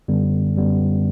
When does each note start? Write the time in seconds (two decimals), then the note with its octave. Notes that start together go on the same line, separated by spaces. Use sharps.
0.08 F#2 D3 G3 B3
0.56 F#2 D3 G3 B3